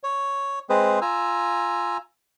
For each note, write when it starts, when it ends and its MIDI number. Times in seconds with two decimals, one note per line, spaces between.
0.03 0.59 73
0.69 0.99 56
0.69 0.99 60
0.69 0.99 68
0.69 0.99 71
0.69 0.99 72
1.01 1.97 65
1.01 1.97 80
1.01 1.97 82
1.01 1.97 88